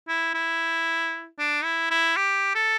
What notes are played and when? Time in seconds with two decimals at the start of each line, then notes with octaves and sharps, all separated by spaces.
0.08 E4
0.34 E4
1.39 D4
1.63 E4
1.91 E4
2.17 G4
2.55 A4